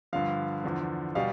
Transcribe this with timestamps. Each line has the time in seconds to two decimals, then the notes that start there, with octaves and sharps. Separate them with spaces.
0.13 G2 D3 F3 F5
0.64 E2 D3 F3
1.15 B2 G3 F5